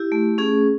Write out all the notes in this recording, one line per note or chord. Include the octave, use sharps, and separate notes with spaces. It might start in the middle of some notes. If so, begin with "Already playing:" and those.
Already playing: E4 G4
A3
C#4 G#4